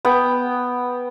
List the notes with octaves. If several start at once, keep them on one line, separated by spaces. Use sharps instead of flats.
B3 G5